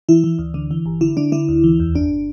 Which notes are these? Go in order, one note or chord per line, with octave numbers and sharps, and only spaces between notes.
E3 E4
E3
D2
D3
E3
G1
D3 E4
D3 D4
D3 E4
D2
E3
E2
G1 D4